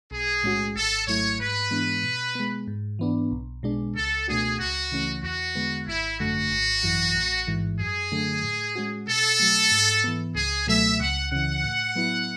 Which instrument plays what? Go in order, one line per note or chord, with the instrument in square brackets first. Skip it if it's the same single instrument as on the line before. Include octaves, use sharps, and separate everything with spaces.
[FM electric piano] B1 [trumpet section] G#4
[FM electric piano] A2 G#3 C#4 F#4
[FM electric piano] G#1 [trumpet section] A4
[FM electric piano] G#2 F#3 A3 E4 [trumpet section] C#5
[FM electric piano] G#2 [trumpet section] B4
[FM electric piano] E3 G#3 B3 D4
B2
G#3 B3
G#2
E3 B3 D4
B1
B2 G#3 D4
[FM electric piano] C#2 [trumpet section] A4
[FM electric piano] B2 A3 D4 F#4 [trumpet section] G#4
[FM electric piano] C#2 [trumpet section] F#4
[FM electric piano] C#3 E3 A3 C#4
[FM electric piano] E2 [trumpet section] F#4
[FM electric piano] D3 G#3 B3
[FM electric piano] G#1 [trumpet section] E4
[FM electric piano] F#2 D3 A3 [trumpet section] F#4
[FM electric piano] G#1
F#2 E3
A1
G#2 E3
[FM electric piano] F#2 [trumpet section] G#4
[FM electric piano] D3 F#3 A3
A2
G#3 C#4 F#4
[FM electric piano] B2 [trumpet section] A4
[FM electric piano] F#3 A3
G#2
E3 B3
[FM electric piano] C#2 [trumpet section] G#4
[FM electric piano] B2 F#3 A3 [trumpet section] E5
[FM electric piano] C#2 [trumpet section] F#5
[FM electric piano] C#3 E3 [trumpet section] F#5
[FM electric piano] A2
F#3 B3 E4